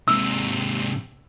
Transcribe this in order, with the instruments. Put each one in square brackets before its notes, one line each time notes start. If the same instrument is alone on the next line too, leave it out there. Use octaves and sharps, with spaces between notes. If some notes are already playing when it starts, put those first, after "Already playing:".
[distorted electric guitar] G#2 C3 [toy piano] E6